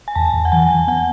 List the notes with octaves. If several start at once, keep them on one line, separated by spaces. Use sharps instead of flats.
G#5
E2 A5
E2
F#5
E3 G#5
E3
B3 F#5